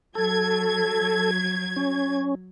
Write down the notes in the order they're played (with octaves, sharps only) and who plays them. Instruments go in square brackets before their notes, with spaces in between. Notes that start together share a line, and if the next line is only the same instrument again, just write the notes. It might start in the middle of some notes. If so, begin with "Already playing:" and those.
[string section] F#3 G#6 [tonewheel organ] A4
[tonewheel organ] C#4